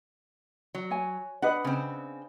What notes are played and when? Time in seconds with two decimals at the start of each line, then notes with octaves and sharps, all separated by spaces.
0.75 F#3
0.91 C#5 G#5
1.42 D4 B4 D#5 F#5
1.64 C#3 C4